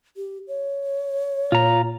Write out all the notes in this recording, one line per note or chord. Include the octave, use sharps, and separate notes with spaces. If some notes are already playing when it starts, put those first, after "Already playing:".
G4
C#5
A#2 F4 A#5